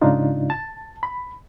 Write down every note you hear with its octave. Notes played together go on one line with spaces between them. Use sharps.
G#2 C#3 D4 D#4 F4
A5
B5